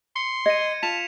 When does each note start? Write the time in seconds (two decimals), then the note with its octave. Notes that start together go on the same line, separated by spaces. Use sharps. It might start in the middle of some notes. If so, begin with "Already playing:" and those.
0.16 C6 C#7
0.46 D#5 G#6 C#7 D#7
0.83 F4 A5 B6 E7 F7